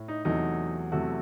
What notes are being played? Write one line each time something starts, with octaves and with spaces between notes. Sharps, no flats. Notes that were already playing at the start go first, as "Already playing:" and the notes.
Already playing: A2
D#4
E2 C3 F#3 A3 D#4
E2 C3 F#3 A3 F#4